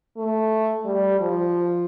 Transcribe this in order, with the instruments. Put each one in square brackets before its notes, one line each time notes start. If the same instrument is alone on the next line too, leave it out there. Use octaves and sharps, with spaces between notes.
[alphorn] A3
G3
F3